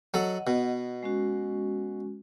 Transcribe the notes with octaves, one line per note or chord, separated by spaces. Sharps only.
F#3 A4 D#5 F#5
B2
G#3 C#4 F#4